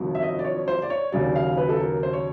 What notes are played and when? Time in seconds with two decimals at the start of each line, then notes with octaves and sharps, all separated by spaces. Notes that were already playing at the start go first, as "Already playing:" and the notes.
Already playing: G1 F2 C3 D#3 F#3
0.15 E5
0.23 D#5
0.39 D5
0.44 C#5
0.68 C5
0.82 D5
0.90 C#5
1.12 D#2 C#3 F#3 D5
1.36 F5
1.57 B4
1.69 A4
1.80 A#4
2.03 C5
2.13 C#5